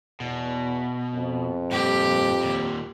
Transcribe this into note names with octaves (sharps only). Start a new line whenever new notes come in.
E2 B2
F2
G2 A#2 G4
D#2 A#2